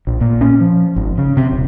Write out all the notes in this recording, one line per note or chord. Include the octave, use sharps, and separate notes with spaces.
A#1
A#2
C#4
F3
G#1
C#3
C3
D#1